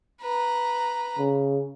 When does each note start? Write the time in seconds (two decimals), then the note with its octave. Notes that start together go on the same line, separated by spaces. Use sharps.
0.21 B4 A#5
1.19 C#3